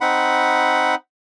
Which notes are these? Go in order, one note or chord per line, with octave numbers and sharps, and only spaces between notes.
C4 D#4 F#5 B5